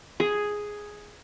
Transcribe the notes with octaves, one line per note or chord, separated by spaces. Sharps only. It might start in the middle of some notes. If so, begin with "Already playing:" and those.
G#4